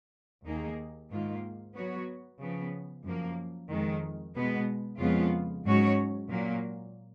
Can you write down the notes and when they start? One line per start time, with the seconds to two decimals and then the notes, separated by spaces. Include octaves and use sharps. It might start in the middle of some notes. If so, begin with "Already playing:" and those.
0.45 D#2 D#3 A#3 D#4 G#4
1.10 G#2 D#3 A#3 F4
1.74 F#3 B3 F#4 C#5
2.40 C#3 F3 B3
3.05 F#2 F3 A#3
3.69 F2 D#3 G#3
4.34 B2 G#3 B3
4.99 F2 C#3 G#3 B3 F4
5.65 G#2 F#3 C#4 F#4 C#5
6.29 A#2 F#3 A#3